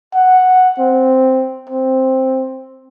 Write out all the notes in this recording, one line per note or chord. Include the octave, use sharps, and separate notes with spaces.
F#5
C4
C4